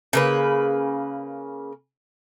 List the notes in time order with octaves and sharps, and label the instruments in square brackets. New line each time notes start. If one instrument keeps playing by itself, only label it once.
[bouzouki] C#3 A#3 B4